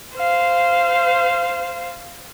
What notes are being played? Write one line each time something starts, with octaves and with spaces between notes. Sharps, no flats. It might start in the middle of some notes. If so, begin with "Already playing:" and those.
C5 F5